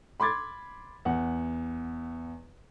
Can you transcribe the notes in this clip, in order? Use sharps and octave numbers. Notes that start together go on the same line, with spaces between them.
B5 C6 D6 G#6 A6
E2 F#5